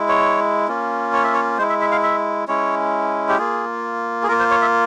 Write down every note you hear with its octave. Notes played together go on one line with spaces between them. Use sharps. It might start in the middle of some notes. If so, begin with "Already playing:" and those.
Already playing: G#3 E4
C#5
A#3 C#4 F4
C#5
E5
C#5
G#3 E4 C5
E5
E5
F5
E5
G#3 C#4 E4 C#5
G4
A#3 F4 G#4
G#4
A#3 F4 A#4
C5
C#5
E5